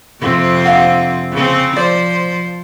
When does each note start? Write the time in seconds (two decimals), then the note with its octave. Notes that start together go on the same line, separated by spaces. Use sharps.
0.21 F2 C3 C4
0.65 D4 F5 F#5
1.32 C#3 C4
1.77 F3 C5 D5